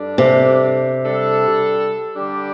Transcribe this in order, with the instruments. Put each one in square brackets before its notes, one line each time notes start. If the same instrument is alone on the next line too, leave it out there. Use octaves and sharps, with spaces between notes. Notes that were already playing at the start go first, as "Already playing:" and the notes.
Already playing: [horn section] G2 G3 D4 A4
[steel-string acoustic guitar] C3
[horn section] G3 D4 A4
D3 G3 D4 G4